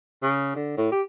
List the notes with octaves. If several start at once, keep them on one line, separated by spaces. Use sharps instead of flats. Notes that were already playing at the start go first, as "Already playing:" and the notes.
C#3
D3
A2
G4